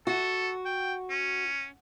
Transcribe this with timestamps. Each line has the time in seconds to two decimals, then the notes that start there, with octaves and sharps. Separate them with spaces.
0.07 F#4 A4
0.65 G5
1.10 C#4